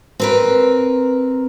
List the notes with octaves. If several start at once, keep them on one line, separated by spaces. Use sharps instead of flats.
C4 A#4 B4